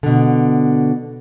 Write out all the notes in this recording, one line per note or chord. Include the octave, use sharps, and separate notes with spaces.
B2 D3